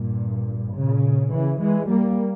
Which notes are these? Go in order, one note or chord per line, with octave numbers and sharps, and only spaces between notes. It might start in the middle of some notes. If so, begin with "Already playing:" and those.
Already playing: G2 A#2
A#2 C#3
C#3 E3
E3 G#3
G3 A#3